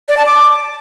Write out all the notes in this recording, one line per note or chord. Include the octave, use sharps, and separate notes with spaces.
D5
A5
D6